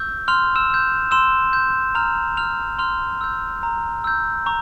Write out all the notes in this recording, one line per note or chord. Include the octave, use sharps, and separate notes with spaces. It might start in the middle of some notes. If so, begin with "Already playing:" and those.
Already playing: C#6 E6 G6
C6 F6 F7
E6 E7
E6 G6
C6 E6 E7
G6
A#5 F6 F7
F6 F7
C6 F6 F7
E6 G6
A#5
E6 G6
A#5 C#6